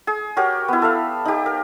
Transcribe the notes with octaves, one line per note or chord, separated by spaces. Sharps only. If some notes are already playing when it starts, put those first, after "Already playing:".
G#4
F#4 G4 A#4 C#5
B3 E4
A4 E5 F5
D#4 G4
A#4